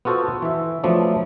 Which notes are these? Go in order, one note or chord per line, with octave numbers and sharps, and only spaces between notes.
B3 F4 F#4 A4 C5
E3 E5
F3 F#3 A3 B3 D4